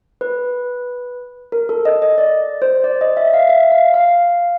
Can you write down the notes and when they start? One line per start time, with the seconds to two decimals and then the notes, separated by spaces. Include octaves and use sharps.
0.21 B4
1.52 A#4
1.69 A4
1.85 D#5
2.02 D#5
2.18 D5
2.62 C5
2.84 D5
3.01 D#5
3.17 E5
3.33 F5
3.49 E5
3.72 F5
3.94 F5